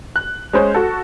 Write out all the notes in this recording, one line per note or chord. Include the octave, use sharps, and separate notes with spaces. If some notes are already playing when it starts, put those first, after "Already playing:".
F#6
G#3 C#4 C5
F#4 A4